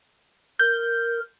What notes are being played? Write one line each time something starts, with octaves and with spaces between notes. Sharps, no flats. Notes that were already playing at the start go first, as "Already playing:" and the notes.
A#4 G6